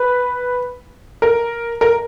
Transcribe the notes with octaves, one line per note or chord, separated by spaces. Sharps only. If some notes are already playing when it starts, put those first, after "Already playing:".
Already playing: B4
A#4
A#4